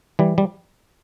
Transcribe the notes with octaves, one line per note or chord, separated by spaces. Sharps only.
E3 G3
G3